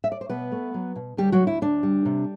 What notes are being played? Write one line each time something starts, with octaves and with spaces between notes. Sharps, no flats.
E5
D5
C5
B2 B3 B4
A3
F#3
B2
D2 G3 G4
F#3 F#4
D2
E4
D2 D4
G3
C3